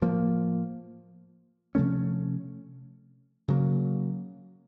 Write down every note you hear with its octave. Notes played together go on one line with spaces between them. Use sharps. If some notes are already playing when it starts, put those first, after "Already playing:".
A2 F3 A#3
C3 F3 A3 C#4
C#3 F#3 A#3